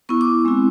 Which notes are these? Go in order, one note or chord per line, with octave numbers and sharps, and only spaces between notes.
B3 E4 C#6
D6
G#3 C4 E4